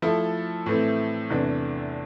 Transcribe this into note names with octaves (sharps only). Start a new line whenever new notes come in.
F3 A3 E4 A4
A2 E3 A3 C4
E2 C3 E3 A3 D4